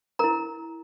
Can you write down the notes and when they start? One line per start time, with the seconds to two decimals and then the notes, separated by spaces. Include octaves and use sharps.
0.19 E4 A#4 A#5